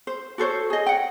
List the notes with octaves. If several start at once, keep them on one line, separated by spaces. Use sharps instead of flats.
C5
F#4 A4 C5 C#5
G#4 D#5
F#5 G5